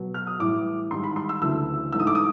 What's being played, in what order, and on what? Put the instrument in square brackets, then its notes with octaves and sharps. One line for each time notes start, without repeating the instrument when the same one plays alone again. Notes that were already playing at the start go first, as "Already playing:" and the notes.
Already playing: [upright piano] B2 F#3 B3
F6
D#6
A2 E3 G3 D6
G#2 D#3 G3 C6
B5
C6
E6
D2 C#3 E3 A3 D4 E6
G#2 E3 A3 D4 E6
D#6
D6
D#6